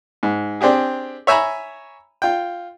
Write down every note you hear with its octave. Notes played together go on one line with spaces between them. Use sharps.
G#2
C4 D4 G4 G#4
C#5 E5 G#5 A#5 B5
F4 G5